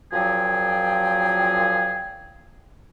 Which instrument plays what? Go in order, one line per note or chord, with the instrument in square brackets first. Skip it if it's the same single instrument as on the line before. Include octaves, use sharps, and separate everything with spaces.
[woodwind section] F#2 A#2 F3 F#3 G#4 G5